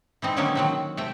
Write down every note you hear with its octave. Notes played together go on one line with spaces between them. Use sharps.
E3 C4 D#4
D3 D#3 F#3 A#3 C#4 D#4
D#3 F#3 C4
C3 A3 G5